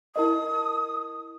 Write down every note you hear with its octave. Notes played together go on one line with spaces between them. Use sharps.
E4 A#4 D#5 D#6